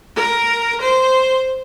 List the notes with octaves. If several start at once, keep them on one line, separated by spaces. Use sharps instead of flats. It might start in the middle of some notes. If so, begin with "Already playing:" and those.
A#4
C5